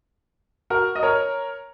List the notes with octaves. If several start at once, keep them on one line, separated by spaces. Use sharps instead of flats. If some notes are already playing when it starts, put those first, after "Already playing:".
F#4 A#4
D#5
A#4 C#5